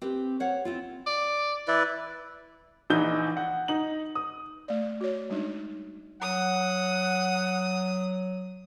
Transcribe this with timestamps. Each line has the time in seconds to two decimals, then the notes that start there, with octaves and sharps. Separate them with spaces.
0.01 C4 G4 B4
0.40 C5 C#5 F5 F#5
0.65 C4 E4 F4
1.06 D5
1.68 E3 E4 B4 D5
2.90 A#1 E3 D#4 G6 G7
3.37 F#5
3.68 D#4 F#7
4.15 D#6
4.68 A3 D5
5.01 F#4 C#5
5.30 G3 G#3 D4 D#4
6.22 F#3 F#5 D#6